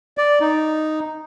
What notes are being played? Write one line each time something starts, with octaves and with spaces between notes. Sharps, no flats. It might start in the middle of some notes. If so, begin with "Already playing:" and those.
D5
D#4